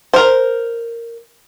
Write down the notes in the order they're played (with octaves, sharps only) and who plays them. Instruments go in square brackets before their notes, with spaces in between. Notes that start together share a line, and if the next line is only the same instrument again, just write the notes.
[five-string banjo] A#4 C5